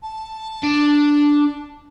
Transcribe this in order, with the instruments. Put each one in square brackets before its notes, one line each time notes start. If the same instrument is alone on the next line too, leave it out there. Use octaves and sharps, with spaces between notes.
[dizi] A5
[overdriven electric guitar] D4